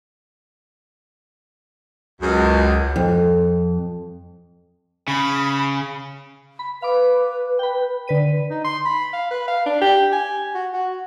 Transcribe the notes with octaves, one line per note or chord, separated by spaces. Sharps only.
C#2 F#2 G#4
F2
C#3 B5
B5
B4 F5 B5 D6
G5 B5
D3 B4 D#7
D#4
C6
B5
F5
B4
F5
D4
G4
G#5
F#4
F#4